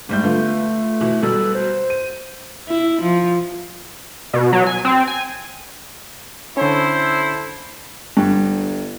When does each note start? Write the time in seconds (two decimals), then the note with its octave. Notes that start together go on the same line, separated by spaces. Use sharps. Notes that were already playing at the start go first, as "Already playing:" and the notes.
0.09 G#2 G3 A3 G6
0.23 D3 B3 F4
1.00 B2 E3
1.22 B2 F#3 G3 A4
1.54 C5
1.90 D#7
2.68 E4
3.02 F3
4.33 B2
4.53 F#3
4.67 G#5
4.85 C4
5.07 G#5
6.57 D3 C#4 E4 A4 C5
8.17 G1 G2